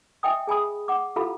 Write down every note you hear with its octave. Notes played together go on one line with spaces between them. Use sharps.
D#5 E5 G5 G#5 D#6
G#4 G#5 B5 D#6
F#5 D6
E4 F4 G4 A4 F5 B5